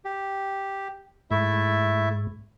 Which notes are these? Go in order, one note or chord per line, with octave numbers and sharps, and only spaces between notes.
G4
G#2 A3 E4 E5